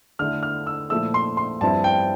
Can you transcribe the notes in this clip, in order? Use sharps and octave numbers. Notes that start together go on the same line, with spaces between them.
D3 A3 E4 F6
F6
E6
A#2 F3 A3 E4 E6
C6
C6
G2 F3 C4 E4 A5
G5